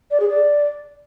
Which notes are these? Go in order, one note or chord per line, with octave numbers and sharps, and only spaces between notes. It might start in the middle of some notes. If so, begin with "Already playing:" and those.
D5
G#4
D5